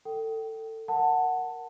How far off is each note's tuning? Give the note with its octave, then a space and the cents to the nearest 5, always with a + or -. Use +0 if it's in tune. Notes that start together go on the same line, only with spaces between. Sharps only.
A4 +20 G5 -25
A#4 +0 F#5 +0 A5 +15